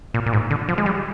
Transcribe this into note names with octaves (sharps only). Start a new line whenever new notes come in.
A#2
A#2
G#2
D3
F3
G#3
G3